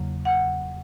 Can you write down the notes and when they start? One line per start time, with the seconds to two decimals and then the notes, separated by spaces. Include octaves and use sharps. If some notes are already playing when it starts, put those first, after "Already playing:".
Already playing: E2 C#3 F#3 A#3
0.25 F#5